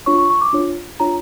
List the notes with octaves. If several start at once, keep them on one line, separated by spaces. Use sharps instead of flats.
D4 F4 C#5 C#6
C#6
C#6
D6
D4 F4 C#5
D4 F4 C#5 A#5